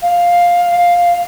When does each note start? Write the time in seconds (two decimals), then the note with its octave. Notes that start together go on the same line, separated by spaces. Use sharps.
0.02 F5